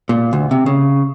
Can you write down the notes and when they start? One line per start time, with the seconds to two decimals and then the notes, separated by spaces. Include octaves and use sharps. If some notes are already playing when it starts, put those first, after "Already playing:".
0.09 A#2
0.33 D2
0.51 C3
0.66 C#3